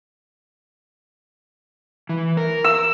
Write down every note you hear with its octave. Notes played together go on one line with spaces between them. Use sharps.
E3
A#4
E6